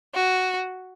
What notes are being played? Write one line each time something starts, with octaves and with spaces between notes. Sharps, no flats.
F#4